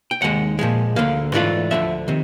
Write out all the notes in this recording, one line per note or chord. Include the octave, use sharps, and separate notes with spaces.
G5
D#2 D#3 G#3 F#5
A#2 F3 G#3
D2 D3 F3 A#3 F5
G#2 E3 A3 D4 F4
D2 D3 F3 E5
C3 D#3